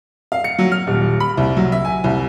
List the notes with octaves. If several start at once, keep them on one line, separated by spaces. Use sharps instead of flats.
F5
C#7
F#3
F6
D#1
B5
C2
F#3
E5
G#5
C2